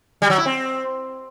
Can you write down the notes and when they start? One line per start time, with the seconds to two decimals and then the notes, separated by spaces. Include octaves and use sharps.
0.22 G3
0.30 F#3
0.38 E4
0.46 C4